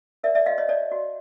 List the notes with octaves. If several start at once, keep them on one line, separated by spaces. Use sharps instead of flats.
A#4 D5 E5
D5 E5
F#4 D#5 F5
C#5 D#5
C#5 D5
F#4